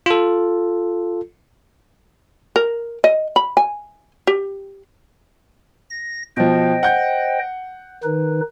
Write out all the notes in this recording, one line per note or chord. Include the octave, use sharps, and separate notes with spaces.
F4 A4
A#4
D#5
B5
G#5
G4
A#6
B2 F3 C5 D#5 G5
F#5 G6
D#3 D#4 B4